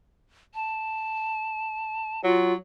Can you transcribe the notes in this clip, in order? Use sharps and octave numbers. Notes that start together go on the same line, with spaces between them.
A5
F#3 F4